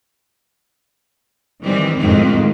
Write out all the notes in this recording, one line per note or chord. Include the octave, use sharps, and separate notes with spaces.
D#3 E3 G3 C4
F2 A2 D#3 G#3 C4